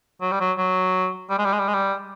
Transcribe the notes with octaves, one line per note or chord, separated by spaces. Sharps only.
F#3
G3
F#3
F#3
G3
G#3
G3
G#3
G3
G#3
G3